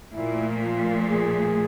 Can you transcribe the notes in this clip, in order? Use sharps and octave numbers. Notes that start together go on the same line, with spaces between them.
A#2 F3 A3 E4
F4
G#4